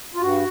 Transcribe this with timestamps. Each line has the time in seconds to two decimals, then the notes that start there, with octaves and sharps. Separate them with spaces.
0.15 F4
0.21 G2 F#4